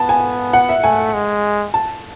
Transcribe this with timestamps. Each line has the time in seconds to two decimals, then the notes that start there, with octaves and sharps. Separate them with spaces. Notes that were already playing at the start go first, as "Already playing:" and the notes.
Already playing: B3 A5
0.09 G#5
0.53 F#5
0.69 E5
0.83 A3 G#5
1.14 G#3
1.74 A5